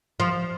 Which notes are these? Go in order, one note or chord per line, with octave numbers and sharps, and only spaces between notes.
F3